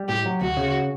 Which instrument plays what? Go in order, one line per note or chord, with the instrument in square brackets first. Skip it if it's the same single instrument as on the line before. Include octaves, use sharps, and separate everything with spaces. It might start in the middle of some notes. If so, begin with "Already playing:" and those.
Already playing: [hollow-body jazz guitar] G3
[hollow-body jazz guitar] A2 [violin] G4
[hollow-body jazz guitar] F#3
[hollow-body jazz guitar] D2 [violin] F#4
[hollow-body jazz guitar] C#3